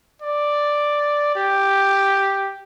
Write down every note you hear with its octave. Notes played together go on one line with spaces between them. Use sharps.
D5
G4